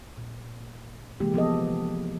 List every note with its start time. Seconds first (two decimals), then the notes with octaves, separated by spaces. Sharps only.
0.17 A#2
1.20 C3 E3 G#3 A#3 G4
1.34 F3 B3 A4 D#5